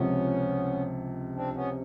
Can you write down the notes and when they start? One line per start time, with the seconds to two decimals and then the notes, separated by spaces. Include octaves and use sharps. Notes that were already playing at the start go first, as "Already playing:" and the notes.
Already playing: C#2 C3 F3 B3 C#4
1.36 C4 D4
1.55 B3 C#4